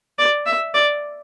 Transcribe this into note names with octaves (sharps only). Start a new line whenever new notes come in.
D5
E5
D5